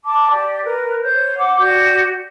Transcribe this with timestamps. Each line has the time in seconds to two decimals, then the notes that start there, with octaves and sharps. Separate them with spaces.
0.04 A5 D6
0.31 G4 D5
0.63 A#4 B4
1.02 C5 C#5 G6
1.37 F#5 D6
1.59 F#4 G4 D5 G6